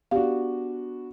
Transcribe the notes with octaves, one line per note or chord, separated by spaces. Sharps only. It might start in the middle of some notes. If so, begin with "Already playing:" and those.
B3 D4 F#4 G4 F5